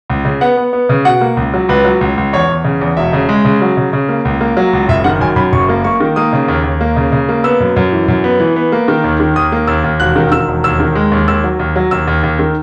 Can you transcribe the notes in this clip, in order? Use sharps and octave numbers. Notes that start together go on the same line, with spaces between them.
C#2
C#3
B3 F#5
B3
B3
C#3
B2 F#5
A#3
C#2
F#3
C#2 B4
F#3
C#2
C#2
E2 C#5
E2
C#3
E2
E1 E5
C#3
G#3
C#3
F#3
C#3
C#3
A#3
C#2
A#3
F#3
C#2
F#1 E5
D#3 F#5
F#2 G#5
F#2 B5
F#1 C#6
A#3
A#3 C#6
D#3
A#3 D#6
C#3
D#2
D#2
A#3
C#3
C#3
A#3
B3 E6
F#2
F#2
E3
F#2
B3
E3
B3
A#3
D#3
D#2
D#3
D#2 D#6
A#3
D#2 E6
D#2
E1 F#6
D#3
D#3 E6
E1
D#2 E6
D#3
G#3
D#2
D#2 E6
F#3
D#2
F#3
D#2 E6
D#2
D#2
D#3